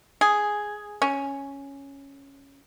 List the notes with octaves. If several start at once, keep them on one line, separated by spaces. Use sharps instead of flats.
G#4
C#4